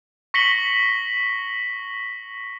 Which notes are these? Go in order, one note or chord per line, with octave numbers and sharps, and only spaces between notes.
C#6 A#6 B6 C#7 F#7 G7